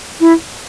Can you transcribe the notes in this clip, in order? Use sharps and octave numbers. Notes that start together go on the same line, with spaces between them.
E4